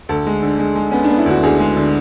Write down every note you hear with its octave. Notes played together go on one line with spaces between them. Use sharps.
D2 A4
G#3
D3
G#3
G#3
B3 C#4
D4
B3
E4
D2
F#4
D2 G#4
G#3
D3